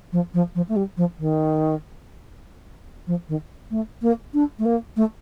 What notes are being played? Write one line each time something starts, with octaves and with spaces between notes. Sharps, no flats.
F3
F3
F3
A3
G3
F3
D#3
F3
D#3
A3
A#3
D4
A3
A#3
A3